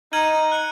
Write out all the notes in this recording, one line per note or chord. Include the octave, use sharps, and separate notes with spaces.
D#4 F6 G#6 D#7 F#7
F#6 C#7 F#7